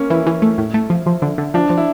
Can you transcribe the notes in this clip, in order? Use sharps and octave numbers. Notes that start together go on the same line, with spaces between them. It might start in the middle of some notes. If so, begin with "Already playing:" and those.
Already playing: A#3 C#4
E3 E4
E3
A3
A2
A3
F3
F3
D3
D3
F3 D4
F3
E4